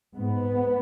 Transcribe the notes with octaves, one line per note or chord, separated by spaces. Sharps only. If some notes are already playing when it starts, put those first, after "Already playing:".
G#2 B3